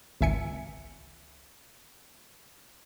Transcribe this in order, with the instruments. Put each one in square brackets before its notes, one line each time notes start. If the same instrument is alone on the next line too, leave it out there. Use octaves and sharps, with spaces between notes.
[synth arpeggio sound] G#1 C#2 E5 G#5 C#7